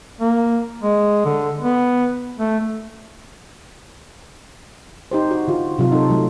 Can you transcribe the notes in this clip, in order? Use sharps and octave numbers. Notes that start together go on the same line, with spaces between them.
A#3
G#3
D3
B3
A3
D#4 G4 C5
F#4
D3 F4 F#4
C3 F#3 F4 F#4
D#4 A4
F#3 A3